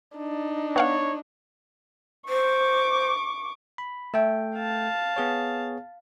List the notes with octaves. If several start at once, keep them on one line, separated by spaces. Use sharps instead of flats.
D4 D#4
B3 C#5 F5 F#5
C5 C#6 D6
B5
A3 A4 E5 G5
F5 A5
B3 G#4 C#5